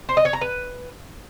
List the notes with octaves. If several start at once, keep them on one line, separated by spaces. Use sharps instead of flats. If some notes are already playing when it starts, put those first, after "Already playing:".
C5
D#5
C#5
A#5
B4